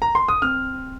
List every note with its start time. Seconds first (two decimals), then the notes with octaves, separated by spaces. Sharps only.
0.02 A#5
0.15 C6
0.28 D#6
0.42 C4 F6